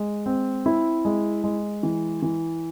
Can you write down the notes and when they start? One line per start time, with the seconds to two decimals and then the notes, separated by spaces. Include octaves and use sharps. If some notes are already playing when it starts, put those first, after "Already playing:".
Already playing: G#3
0.26 C4
0.66 E4
1.05 G#3
1.44 G#3
1.83 E3
2.22 E3